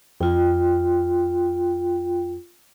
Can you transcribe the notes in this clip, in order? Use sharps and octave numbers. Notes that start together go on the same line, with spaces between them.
F2 F4 G5